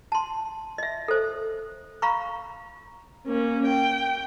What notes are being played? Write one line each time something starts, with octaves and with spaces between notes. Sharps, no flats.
A5 C6
D#5 E5
A4 C5
F5 A#5 B5 C#6
A#3 C#4
G5